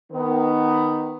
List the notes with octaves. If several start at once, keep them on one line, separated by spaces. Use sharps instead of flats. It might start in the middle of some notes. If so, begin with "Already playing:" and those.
D#3 B3